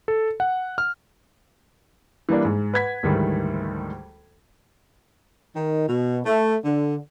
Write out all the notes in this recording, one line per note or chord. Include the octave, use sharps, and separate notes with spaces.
A4
F#5
F6
E3 G3 A#3 D4
G#2
B4 F#5 G#6 B6
D2 G#2 D#3 E3 G3 A3
D#3
B2
A3
D3